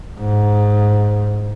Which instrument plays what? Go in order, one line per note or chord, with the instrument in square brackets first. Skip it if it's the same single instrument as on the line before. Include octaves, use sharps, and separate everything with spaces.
[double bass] G#2